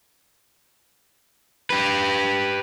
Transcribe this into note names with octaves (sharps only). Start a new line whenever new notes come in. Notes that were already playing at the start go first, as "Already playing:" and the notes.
G4 B4